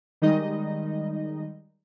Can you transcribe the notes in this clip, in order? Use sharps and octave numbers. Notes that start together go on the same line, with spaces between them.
D#3 G3 G#3 D#4 D#5